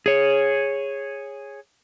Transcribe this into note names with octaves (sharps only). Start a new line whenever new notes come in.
G#4 C#5